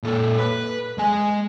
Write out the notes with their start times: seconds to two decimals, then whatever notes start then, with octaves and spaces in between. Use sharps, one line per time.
0.03 A#2 A4
0.38 B4
0.98 G#3 G#5